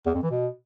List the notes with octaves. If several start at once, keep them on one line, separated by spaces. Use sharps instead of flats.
E2
F2
E3
B2